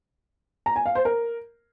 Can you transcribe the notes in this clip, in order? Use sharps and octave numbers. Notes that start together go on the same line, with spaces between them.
A#5
G#5
F5
C5
A#4